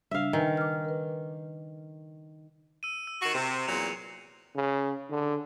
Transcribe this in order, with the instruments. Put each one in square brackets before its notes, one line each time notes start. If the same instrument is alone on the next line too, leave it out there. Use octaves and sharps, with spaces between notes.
[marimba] C#3 G3 D4 [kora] E5 F5
[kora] D#3 [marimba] B4 G5 G#5
[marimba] D6 F6
A#4 B4
[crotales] E6 D#7
E6
[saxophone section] D#3 F#4 [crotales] C7 E7
[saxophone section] C3
[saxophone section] E2 A#2 F#3 [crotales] C#7 F7
[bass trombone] C#3
D3